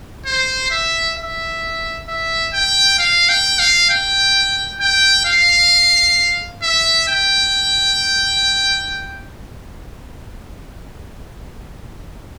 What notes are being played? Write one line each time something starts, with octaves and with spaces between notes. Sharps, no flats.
C5
E5
E5
E5
G5
F5
G5
F5
G5
G5
F5
E5
G5